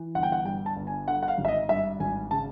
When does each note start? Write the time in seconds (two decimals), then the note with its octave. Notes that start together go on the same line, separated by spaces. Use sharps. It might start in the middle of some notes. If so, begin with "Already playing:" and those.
Already playing: E3
0.15 G1 F#5
0.23 G5
0.32 F#5
0.45 G2 G5
0.66 A5
0.76 G1
0.87 G#5
1.07 D3 F#5
1.23 F#5
1.28 F5
1.38 G#1
1.45 E5
1.48 D#5
1.69 G2 E5
2.00 G#1 G#5
2.31 C#3 A5